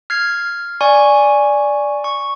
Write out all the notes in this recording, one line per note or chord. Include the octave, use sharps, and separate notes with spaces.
F6 G#6 C7
D5 G#5 C#6
C#6